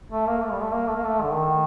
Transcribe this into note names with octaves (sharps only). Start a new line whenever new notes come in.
A3
A#3
A3
G3
A3
A#3
A3
A#3
A3
D3
D#3